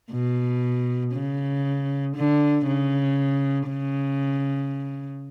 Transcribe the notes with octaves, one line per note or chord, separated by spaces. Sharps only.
B2
C#3
D3
C#3
C#3